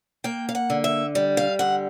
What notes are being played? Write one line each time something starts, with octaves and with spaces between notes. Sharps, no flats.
A#3 G5
F5
F#5
D3
E5
G3
F5
D3 F#5